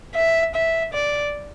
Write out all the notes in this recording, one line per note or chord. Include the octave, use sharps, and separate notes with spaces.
E5
E5
D5